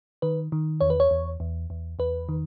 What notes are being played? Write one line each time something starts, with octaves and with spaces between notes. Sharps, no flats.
D#3 B4
D#3
E2 C#5
B4
C#5
E2
E2
E2
E2 B4
D#3